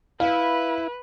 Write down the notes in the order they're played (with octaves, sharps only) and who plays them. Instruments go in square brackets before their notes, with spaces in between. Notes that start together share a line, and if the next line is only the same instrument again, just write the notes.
[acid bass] E4 [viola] B4 [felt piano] F5